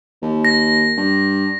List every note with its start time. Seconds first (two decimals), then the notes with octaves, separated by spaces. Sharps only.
0.22 D#2
0.45 A#6
0.97 G2